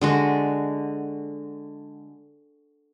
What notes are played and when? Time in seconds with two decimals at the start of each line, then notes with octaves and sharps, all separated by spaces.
0.01 D3 G#3 F#4